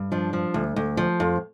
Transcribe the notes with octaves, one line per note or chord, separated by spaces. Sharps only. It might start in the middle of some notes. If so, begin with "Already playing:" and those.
Already playing: G2
F3 D4
F3
D2
D2
F3
F2